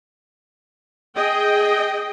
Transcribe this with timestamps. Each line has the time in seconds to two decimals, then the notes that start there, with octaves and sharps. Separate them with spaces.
1.16 G#4 D#5 G5